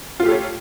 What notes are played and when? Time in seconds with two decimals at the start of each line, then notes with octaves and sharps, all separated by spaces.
0.20 F4
0.23 A3
0.25 G4
0.28 A4
0.31 C#5